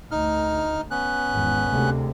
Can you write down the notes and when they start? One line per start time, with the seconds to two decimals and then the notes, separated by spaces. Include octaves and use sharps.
0.11 D2 D#4 F6
0.91 B3 C#4 F#6
1.30 G#1 E2
1.68 D2 C3 G#3